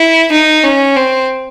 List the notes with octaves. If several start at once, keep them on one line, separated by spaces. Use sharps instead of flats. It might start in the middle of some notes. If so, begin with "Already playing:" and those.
Already playing: E4
D#4
C#4
C4